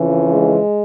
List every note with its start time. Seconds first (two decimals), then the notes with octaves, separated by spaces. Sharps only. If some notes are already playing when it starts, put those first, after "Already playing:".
Already playing: F2 C#3 E3
0.31 G#3